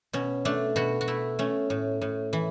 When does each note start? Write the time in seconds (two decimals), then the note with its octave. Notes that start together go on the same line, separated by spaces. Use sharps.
0.13 B2 C#4
0.45 A3 D4
0.76 B2 F#4
1.01 F#4
1.08 A3 E4
1.39 A3 C#4
1.70 A2
2.01 A2
2.33 E3